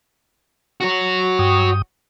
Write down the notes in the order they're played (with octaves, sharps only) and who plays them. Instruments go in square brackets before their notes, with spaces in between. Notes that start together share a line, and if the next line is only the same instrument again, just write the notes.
[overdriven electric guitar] F#4 C#5
[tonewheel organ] G2 G5 D#6